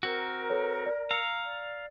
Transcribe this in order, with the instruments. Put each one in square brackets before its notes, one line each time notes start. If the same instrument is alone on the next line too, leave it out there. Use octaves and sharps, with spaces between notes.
[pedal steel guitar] C4 F#4 [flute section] A#4
[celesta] A4 B4 C#5
D5
[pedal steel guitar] F5 A#5 [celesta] E6 C#7
[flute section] D5